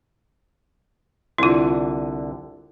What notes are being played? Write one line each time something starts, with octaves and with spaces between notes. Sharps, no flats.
C2 D3 E4 F4